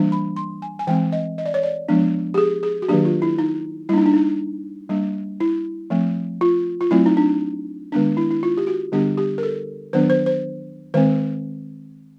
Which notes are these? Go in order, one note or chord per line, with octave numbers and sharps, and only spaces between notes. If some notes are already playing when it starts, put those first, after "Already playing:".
Already playing: E3 G3 A#3 D4
B5
C6
G#5
G#5
E3 G#3 C4 G5
D#5
D#5
D5
C#5
D5
F3 G#3 B3 D4
G4
G#4
G#4
F#4
D#3 F#3 A#3 D4 G4
F4
E4
D#4
G3 A#3 D4 E4
D#4
D4
D#4
G3 A#3 D4
E4
F3 A3 C4
F4
F4
F#3 A3 C4 E4
D#4
D4
D#3 G#3 B3 D4
E4
E4
F4
G4
F#4
D3 G3 B3 D4 G4
G4
A#4
A4
D#3 F#3 B3 D4 C5
C5
C5
D#3 G#3 C4 C5